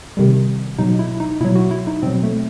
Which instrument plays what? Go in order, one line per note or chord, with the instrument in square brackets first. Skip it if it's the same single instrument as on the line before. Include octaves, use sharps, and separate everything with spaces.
[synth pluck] C3 D#3 G3
B2 F#3 D#4
E4
D#4
B2 F#3 E4
F#4
E4
D#4
B2 F#3 C4
A3